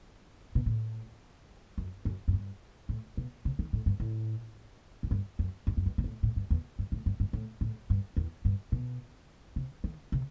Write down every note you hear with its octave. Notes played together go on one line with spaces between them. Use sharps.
B2
A2
F#2
F#2
F#2
G2
A2
B2
C3
D#3
A2
G2
A2
F#2
G2
F#2
F#2
F#2
G2
B2
A2
A2
G2
E2
G2
A2
G2
G2
A2
A2
G2
E2
G2
B2
C3
D#3
C3